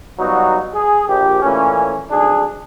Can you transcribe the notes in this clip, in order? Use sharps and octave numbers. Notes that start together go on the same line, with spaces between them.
F#3 G3 B3 D#4 F4 F#4
G#4
A#1 G4
A#2 E3 A3 C#4
B1 F2 G#2 D4 G#4